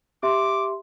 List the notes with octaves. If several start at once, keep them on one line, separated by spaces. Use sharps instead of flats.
G4 E5 C6 D6